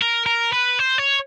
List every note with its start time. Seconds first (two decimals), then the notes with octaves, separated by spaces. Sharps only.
0.02 A#4
0.26 A#4
0.53 B4
0.79 C5
0.98 C#5